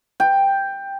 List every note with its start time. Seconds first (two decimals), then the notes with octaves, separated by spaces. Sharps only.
0.20 G5